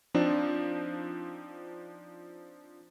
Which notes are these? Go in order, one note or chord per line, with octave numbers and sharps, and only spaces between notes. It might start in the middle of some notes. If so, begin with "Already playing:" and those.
F3 C4 D4 D#4